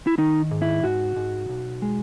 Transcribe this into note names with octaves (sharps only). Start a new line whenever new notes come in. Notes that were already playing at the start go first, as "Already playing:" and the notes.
E4
D#3 D#4
G#2
E4
G#2 F#4
G#2
B1
G#3